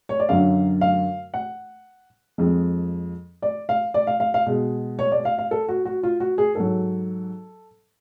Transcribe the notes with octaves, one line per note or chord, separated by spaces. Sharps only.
C#5
D5
F#2 D3 F#3 F5
F5
F#5
F2 F3 G#3
D5
F5
D5
F5
F5
F5
B2 G#3
C#5
D5
F5
F5
A4
F#4
F#4
F4
F#4
G#4
G#2 F#3 A4